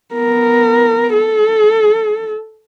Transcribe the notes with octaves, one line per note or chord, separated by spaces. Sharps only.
B3 A#4
A4